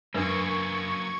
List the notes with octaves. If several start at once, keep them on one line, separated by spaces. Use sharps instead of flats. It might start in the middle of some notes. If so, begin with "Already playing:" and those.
F#2 F#3 A#3 D4 A#4 B4 C#6 G#6